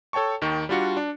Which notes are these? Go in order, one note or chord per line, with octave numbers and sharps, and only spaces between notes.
A4 C#5 G5 A5 C#6
D#2 D#3 G5 C#6
G3 D4 F4 F#4 C#7
D4